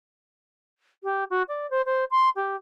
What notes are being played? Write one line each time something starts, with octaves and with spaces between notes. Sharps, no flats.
G4
F#4
D5
C5
C5
C6
G4